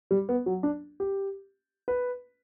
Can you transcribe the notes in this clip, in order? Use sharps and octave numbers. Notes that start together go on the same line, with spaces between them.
G3
B3
F#3
D4
G4
B4